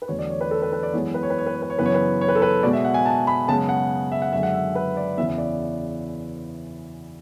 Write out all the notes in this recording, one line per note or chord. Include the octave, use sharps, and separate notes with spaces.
B4
E2 D3 F#3 A3 C#5
D5
C#5
B4
A4
B4
B4
D5
F#2 E3 G#3 B3 C#5
B4
C#5
B4
C#5
B4
C#5
B4
C#5
F#2 C#3 E3 B3 B4
C#5
B4
C#5
B4
A4
B4
B2 G#3 B3 D5
E5
F#5
G#5
A5
B5
F#2 C#3 G#3 B3 A5
F#5
E5
F#5
F#2 D3 G#3 E5
F#5
E5
B4
D5
E2 C#3 E3 B3 E5
D5